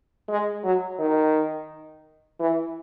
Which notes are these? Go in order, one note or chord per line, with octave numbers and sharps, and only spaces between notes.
G#3
F#3
D#3
E3